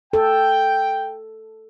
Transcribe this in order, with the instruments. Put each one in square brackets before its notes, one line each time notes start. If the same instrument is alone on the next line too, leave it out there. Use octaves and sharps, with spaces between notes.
[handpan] A4 [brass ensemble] G5